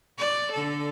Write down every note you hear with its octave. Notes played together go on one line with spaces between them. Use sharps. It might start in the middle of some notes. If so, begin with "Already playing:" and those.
D5
D3 A4